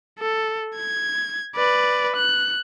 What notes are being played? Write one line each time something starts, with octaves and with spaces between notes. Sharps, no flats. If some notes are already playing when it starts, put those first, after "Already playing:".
A4
G#6
B4 D5
F#6